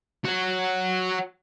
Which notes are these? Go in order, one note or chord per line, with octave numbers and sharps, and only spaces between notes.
F#4 C#5